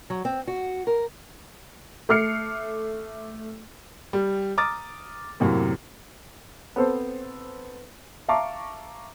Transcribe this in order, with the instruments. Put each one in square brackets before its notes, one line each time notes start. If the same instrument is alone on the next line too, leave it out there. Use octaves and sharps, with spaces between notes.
[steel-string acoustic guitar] F#3
C4
F#4
A#4
[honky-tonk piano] A3 D6 F6 C7 C#7
[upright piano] G3
A#5 D6 D#6 F6 A6
F#2 A2 C3 A#3
B3 C4 A4 C5
E5 F5 A5 A#5 C#6 D6